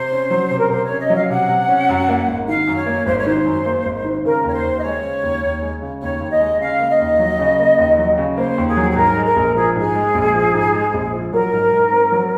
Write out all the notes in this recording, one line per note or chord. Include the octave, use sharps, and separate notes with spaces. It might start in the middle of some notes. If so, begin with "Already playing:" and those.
Already playing: C3 C5
C#4
F#3
C3
A#4
C3 C5
C#5
C#4
D#5
F#3
F5
C3 F#5
C3
C#4
F#2
A#3
G#1
D#3 F5
F#2
C#5
A#3
G#1 C5
C#5
D#3 C5
F#2
A#3
G#1
D#3
C#3 A#4
D#2 C#5
C5
D#2
D#5
G#3 C#5
C#3
D#2
D#2
G#3
C#3
D#2 C#5
D#2
D#5
G#3
C#3 F5
A#3
D#5
D#2
F#3
C#3
A#3
D#2
F#3
C#3
A#3 C5
D#2
G#4
F#3
G#4
G#2 A#4
G#3
A#4
A#1
F3 G#4
G#2 G#4
G#3
A#1
F3
G#2
G#3
A#1
F3
F#3 A#4
G#2
G#2
C4
F#3